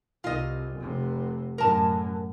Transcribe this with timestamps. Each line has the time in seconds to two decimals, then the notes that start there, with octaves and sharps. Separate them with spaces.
0.24 C2 F4 D#5
0.78 F1 C3
1.58 F#2 A2 A#4 A5